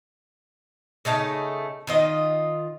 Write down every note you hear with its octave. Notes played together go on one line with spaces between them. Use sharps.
C#3 A3 D#4 A5
D#3 F4 D#5